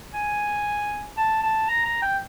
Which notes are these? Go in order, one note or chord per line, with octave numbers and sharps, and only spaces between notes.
G#5
A5
A5
A#5
A#5
G5